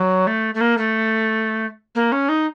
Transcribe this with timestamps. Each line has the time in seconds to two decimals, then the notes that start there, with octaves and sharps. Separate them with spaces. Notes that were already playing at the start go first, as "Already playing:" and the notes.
Already playing: F#3
0.27 A3
0.55 A3
0.61 A#3
0.78 A3
1.95 A#3
2.12 C#4
2.29 D#4